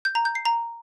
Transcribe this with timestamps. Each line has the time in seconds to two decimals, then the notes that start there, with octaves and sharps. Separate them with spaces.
0.05 G6
0.15 A#5
0.25 G6
0.35 C7
0.45 A#5